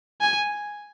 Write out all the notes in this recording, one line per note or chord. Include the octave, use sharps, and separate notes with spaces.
G#5